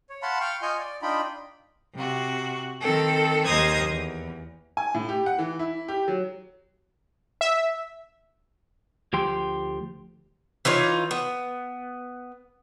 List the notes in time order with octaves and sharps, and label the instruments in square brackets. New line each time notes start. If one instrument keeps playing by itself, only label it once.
[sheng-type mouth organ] C#5
F5 F#5 A5 B5 C6
F5 G5 C#6 F6
F4 D#5 G#5 C#6 F6 G6
D5
D4 D#4 F4 G5 B5
[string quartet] C3 F#4
D#3 C4 A4
D#2 C5 D#5 A#5 D#6 G#6
E2
[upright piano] G#5
A2
G4
F#5
E3
E4
G4
F#3
[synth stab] E5
[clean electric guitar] D2 F3 G4 G5 C6
[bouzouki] E3 D#4 F4 C#5
B3